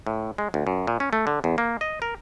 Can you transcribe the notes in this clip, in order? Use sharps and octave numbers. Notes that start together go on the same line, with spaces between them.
A2
G#3
D2
F#2
A#2
C#4
A3
D3
E2
A#3
D#5
A#4